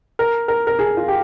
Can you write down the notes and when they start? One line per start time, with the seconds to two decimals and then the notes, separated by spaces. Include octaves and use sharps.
0.19 A#4
0.48 A#4
0.67 A#4
0.79 G#4
0.97 F4
1.08 G4